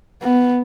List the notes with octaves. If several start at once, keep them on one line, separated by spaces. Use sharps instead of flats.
B3